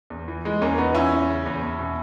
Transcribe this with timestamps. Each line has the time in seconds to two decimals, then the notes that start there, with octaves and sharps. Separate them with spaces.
0.10 E2
0.28 E3
0.45 E3 G#3
0.61 E2 A#3 C#4
0.78 E2 B3 D#4
0.95 E3 C#4 E4
1.12 E2
1.29 C#3
1.46 E2
1.63 E2
1.79 B2